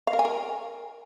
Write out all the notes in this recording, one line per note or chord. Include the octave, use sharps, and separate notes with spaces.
F5
A#4
G#5
A#4